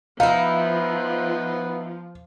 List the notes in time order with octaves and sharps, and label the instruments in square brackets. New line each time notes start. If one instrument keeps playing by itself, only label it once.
[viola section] F3 [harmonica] B3 [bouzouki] D#4 E4 [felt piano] F5